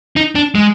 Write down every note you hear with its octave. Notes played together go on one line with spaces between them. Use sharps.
D#4
D4
G#3